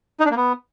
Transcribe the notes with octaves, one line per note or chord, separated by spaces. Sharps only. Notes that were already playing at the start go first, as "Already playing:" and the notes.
D#4
D4
A#3
B3